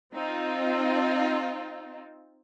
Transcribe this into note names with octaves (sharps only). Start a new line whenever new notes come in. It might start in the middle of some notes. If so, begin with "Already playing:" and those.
C4 D#4 F4